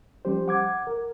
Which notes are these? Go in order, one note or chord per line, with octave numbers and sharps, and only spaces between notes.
F3 G3 C#4 G4 C5
F#5 D6 G#6
A#4